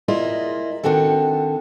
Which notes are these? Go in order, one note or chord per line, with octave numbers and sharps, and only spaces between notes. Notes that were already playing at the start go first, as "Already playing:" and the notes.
E4 F4 G#4 A#4 D5 D#5
D#3 F#3 C4 D4 F#4 A4